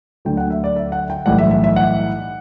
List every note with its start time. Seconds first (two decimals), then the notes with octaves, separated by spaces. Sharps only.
0.25 D2 D3 F#3 G5
0.37 F#5
0.50 E5
0.64 D5
0.76 E5
0.92 F#5
1.10 G5
1.26 B1 A2 E3 G3 F#5
1.39 E5
1.51 E5
1.64 E5
1.76 F#5